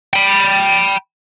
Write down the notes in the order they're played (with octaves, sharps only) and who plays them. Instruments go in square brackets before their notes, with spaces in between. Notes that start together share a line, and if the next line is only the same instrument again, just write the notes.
[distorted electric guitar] G5 B5